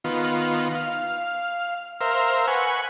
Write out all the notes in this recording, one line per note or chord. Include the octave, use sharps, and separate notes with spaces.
D#3 B3 F4
F5
A#4 C5 E5 F5
B4 F#5 G#5 C#6